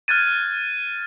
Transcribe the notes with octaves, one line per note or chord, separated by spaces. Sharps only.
F6 F#6 G#6 A6 D#7